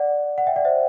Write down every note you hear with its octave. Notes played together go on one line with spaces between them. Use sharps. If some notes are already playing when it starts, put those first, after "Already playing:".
Already playing: D5 F#5
F#5
E5 G5
D5 F#5
C5 E5